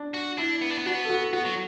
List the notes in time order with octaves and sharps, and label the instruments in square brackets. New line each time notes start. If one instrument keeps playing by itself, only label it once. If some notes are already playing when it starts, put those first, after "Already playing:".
Already playing: [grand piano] D4
[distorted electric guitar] F#4
[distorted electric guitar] D4 [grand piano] E4
[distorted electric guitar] B3
D4
B3
[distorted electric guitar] D4 [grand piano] F#4
[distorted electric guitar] B3
[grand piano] A4
F#4
[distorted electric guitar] B3 [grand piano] F#4
[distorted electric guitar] F#3